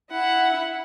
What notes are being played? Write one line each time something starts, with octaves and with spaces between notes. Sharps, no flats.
E4 F#5